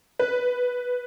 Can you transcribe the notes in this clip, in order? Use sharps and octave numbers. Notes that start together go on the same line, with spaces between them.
B4